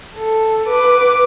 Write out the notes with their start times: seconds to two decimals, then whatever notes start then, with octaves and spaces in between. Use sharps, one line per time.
0.16 A4
0.67 B4 D6